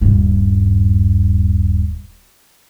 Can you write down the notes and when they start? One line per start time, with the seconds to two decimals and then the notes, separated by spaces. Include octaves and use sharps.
0.01 D#1 G2